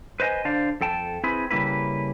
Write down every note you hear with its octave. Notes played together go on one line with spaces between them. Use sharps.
B4 C5 D#5 G5 G#5
D3 D4 C5 D5 F5
F2 A4 G5 A5
C4 E4 G#4 B4
C#3 G3 A#3 E4 B4